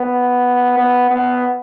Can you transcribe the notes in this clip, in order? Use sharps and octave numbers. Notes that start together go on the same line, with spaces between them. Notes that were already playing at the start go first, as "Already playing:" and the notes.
Already playing: B3
B3
B3